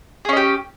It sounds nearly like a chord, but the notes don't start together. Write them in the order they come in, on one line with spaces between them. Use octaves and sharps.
G#4 C#4 D#5 G4